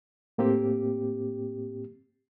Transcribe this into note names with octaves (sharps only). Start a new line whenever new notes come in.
A2 A#3 C4 G4